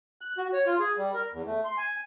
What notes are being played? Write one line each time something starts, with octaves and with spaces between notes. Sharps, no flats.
F#6
F#4
C#5
F4
G#4
G3
A#4
E2
A3
C6
G#5